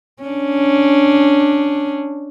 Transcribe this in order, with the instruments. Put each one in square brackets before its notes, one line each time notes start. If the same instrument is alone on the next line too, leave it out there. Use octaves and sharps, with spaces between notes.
[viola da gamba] C#4 D4